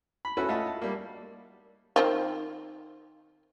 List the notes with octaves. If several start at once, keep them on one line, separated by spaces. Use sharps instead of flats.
B5
C#4 E4 F#4 A4 B4
A3 F4 D#5 E5 F#5 A5
A5
G3 A#3
D#3 C4 F4